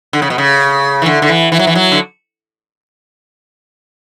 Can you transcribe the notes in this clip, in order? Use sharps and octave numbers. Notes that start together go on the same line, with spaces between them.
D3
C#3
B2
C#3
E3
D3
D3
E3
E3
F#3
E3
F#3
D3